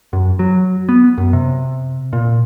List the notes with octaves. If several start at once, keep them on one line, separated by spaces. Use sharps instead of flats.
F#2
F#3
B3
F#2
C3
A#2